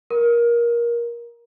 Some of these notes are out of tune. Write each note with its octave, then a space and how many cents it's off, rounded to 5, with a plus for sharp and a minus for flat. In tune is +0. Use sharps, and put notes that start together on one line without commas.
A#4 +20